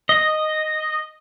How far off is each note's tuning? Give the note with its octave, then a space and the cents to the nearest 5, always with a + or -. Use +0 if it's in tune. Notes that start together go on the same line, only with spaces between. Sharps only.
D#5 -5